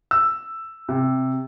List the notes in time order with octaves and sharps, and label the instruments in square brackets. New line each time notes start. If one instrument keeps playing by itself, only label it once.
[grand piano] E6
C3